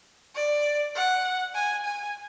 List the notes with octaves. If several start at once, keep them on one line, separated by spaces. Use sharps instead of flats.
D5
F#5
G#5
G#5